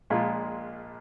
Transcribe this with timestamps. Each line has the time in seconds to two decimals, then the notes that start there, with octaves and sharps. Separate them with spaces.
0.10 A#1 A#2 G#3 F4